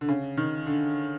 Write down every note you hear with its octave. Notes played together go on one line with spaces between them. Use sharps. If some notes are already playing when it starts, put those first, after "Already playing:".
D3
C#3
D#3
D3